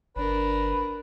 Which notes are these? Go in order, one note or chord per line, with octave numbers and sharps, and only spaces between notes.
G1 D4 A#4 B4